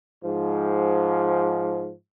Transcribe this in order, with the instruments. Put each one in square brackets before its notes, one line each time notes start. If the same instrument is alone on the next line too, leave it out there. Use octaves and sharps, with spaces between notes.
[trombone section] G#2 F3